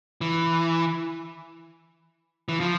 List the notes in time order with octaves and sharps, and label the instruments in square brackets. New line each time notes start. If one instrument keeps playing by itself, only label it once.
[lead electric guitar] E3
E3
F3